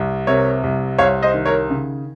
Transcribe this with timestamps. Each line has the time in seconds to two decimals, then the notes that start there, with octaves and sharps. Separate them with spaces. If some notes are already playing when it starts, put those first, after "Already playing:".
Already playing: C2
0.27 C3 A#4 C#5
0.63 C2
0.98 C2 C#5 F5
1.22 C5 D#5
1.34 D#3
1.46 A#4 C#5
1.70 C#3